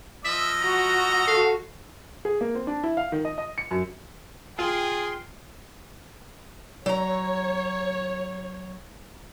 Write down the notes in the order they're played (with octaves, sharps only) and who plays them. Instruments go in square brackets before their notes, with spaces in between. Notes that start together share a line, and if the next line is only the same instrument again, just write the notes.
[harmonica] F3 D#5 E6 [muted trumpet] E5
[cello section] F#4 [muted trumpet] A#5
[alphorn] A4 [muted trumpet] F5
[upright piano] G#4
A#3
C4
D4
E4
F5
D#3
D#5
D#5
C#7
F#2
[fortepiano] F4 [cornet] G#4 [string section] G5 C6
[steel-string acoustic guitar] F#3 A#5 [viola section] C#5